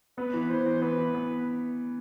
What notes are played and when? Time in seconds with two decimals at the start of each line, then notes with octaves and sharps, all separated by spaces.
0.18 B3 B4
0.34 E3
0.50 E3 C5
0.66 E3
0.82 B3 B4
0.98 E3
1.14 B3